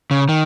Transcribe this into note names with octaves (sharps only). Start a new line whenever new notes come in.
C#3
D#3